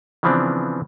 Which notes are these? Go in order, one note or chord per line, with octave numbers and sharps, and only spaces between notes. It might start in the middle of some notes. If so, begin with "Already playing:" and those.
C#3 E3 F3 B3 C4 D4